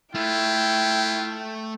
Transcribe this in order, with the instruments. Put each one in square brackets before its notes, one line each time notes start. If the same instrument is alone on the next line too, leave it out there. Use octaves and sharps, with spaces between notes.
[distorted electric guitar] A3 [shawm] E4 [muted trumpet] F4 [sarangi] G5